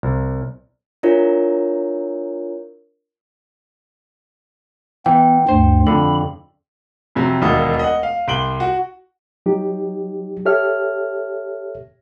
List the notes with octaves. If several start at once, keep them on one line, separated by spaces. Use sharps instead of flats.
C2
D4 E4 F4 A#4 C#5
E3 B3 G5
D2 G2 C5
F2 D3 B5
F2 C3 F#3
E1 D#2 A#3 D#4 F#4
D#5 F#5
F5
C2 C6 D7 F#7 G7
F#4
F#3 D#4 G4
G4 A4 C#5 E5 F6